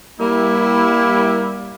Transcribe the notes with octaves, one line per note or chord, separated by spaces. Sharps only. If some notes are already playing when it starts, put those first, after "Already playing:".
G3 A#3 E4